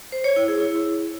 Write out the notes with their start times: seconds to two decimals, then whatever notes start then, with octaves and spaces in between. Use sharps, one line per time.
0.12 C5
0.24 C#5
0.36 E4
0.48 G#4
0.60 E4